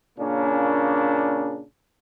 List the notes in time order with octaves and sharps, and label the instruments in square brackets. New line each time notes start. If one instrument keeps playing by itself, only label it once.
[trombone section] A#2 C#3 A#3 C#4 D4